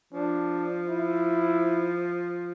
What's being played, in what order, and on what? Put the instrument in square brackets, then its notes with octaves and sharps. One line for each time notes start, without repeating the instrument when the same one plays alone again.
[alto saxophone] F3 [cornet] D4
[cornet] E4